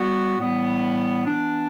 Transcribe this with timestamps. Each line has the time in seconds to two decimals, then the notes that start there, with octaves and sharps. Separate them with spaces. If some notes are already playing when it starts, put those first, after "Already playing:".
Already playing: G3 B3 F#4
0.37 A2 E3 G3 B3
1.26 E3 B3 D4